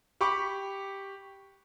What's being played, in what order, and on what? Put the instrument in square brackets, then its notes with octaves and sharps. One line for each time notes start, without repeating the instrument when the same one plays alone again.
[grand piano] G4 B5 C#6 D6